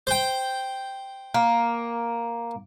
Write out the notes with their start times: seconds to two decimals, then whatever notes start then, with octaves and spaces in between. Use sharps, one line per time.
0.07 C5 G5
1.34 A#3